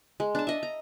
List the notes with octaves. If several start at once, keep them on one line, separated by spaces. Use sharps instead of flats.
G#3
D4 A5
D#5 E5
A#5